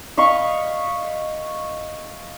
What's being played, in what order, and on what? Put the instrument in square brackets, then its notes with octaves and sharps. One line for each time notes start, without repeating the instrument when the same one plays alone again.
[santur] D#5 F5 B5 C#6